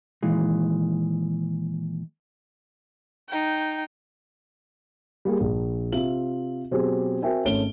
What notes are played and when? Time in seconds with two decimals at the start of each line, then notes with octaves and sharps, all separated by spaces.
0.23 A#2 D#3 E3 G#3
3.29 D#4 G5
5.25 G3 A#3 G#4
5.40 A#1
5.92 C3 F4 E5 F#7
6.71 B2 F#3 C4 G4 G#4
7.22 C4 F#4 A#4 E5 G5 G#5
7.45 G#1 A3 C#4 D7 G7